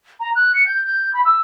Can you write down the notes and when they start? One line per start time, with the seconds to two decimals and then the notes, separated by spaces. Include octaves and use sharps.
0.20 A#5
0.35 F#6
0.54 C#7
0.66 G6
0.85 G6
1.13 B5
1.25 E6